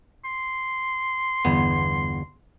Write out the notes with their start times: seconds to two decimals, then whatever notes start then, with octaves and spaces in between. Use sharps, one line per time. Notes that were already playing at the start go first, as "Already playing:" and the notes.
0.25 C6
1.45 G1 E2 B3